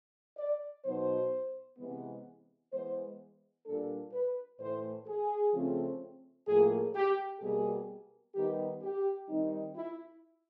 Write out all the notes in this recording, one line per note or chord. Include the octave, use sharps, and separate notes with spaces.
D5
B2 F#3 B3 D#4 C5
C3 E3 G#3 B3
E3 G#3 B3 C5
A#2 G3 A#3 D4 A4
B4
A2 E3 A3 C5
G#4
C#3 F3 A3 C4
A2 F3 A#3 G#4
G4
B2 G3 A#3 G#4
D#3 G3 B3 D#4 G4
G4
D#3 G3 C4 D#4
E4